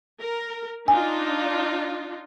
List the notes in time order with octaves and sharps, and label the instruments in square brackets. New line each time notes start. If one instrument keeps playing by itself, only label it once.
[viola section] A#4
[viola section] D4 D#4 F4 [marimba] G#5